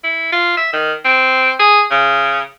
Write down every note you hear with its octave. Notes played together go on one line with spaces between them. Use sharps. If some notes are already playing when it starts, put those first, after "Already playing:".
E4
F4
E5
D#3
C4
G#4
C#3